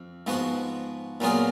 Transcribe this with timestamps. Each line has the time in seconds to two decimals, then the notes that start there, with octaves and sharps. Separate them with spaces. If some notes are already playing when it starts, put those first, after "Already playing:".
Already playing: F2
0.27 G#2 F3 B3 F#4
1.20 A#2 F#3 B3 F4 G#4